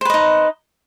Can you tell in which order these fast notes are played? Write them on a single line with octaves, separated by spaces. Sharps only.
C5 B4 D#5 D#4